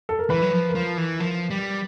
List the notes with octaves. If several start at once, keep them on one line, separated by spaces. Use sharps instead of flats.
A4
A#4
E3 B4
F#3
F3
A#4
F3 B4
E3
F3 A#4
G3